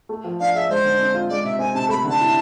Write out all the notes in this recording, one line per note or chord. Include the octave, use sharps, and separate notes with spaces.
A3
F3
D4 F5
G#4 E5
G#3 C5
D3
C4
F4
G#3 D5
C3 E5
C4 G#5
C3 A5
A3 B5
D3
A5
E4